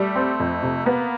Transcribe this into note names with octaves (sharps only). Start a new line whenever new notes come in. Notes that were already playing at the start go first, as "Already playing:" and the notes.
Already playing: G3 A3
C4
F2
C3
A#3 B3